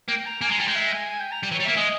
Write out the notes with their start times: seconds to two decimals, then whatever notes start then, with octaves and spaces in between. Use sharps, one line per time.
0.08 A#3 G5
0.26 A#5
0.41 A#3 G#5
0.50 G#3 A#5
0.59 G3 G#5
0.67 G#3 G5
0.75 E5
0.92 G#5
1.10 G#5
1.20 G5
1.31 A#5
1.43 G3
1.51 E3
1.54 C#5
1.60 G3
1.65 A#3 E5
1.76 G#3 D#5